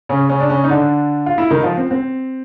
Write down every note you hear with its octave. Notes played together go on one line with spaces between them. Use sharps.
C#3 C#4
C#3 C#4
D4
C#3 C#4
D#4
D3 D4
F4
E4
D#3 D#4
F3 F4
C4
C4